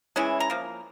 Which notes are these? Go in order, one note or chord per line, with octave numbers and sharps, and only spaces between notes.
E3 G#3 C#4 E4
A#5
F3 A#3